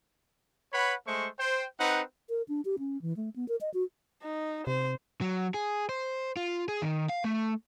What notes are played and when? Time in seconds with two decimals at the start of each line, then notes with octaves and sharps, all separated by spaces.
0.73 B4 C#5 F#5 B5
1.07 G#3 A3 C5 C#6
1.39 C5 G5
1.80 C4 D#4 B4 F#5
2.29 A#4
2.49 D4
2.65 G4
2.79 C#4
3.02 E3
3.17 A3
3.36 B3
3.48 A#4
3.61 D#5
3.74 F#4
4.23 D#4
4.67 C3 C5
5.21 F#3
5.54 G#4
5.89 C5
6.37 F4
6.68 G#4
6.82 D#3
7.09 F5
7.24 A3